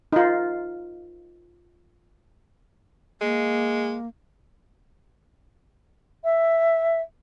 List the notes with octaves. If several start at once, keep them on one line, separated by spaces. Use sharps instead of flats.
D#4 F4
G#3 A#3
E5